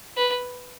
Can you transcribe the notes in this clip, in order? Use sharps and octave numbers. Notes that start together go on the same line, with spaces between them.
B4